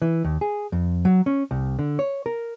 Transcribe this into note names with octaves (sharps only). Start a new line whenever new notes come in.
E3
D#2
G#4
F2
F#3
C#4
C2
D3
C#5
A#4